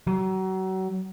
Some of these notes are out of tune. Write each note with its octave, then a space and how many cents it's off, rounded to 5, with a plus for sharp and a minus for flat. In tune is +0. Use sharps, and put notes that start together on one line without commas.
F#3 +30